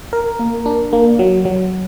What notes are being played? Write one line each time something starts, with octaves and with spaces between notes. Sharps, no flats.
A#4
A#3
D4
A#3
F#3
F#3